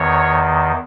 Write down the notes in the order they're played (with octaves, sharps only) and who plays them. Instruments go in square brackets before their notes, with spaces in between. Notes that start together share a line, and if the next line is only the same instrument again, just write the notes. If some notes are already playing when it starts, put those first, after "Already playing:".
Already playing: [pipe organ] E2 D#3 C#5